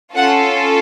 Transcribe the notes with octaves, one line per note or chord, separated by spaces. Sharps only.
C#4 F4 A4 F#5